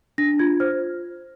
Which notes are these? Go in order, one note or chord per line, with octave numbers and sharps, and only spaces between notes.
D4 A#6
F4 G#6
C5 F6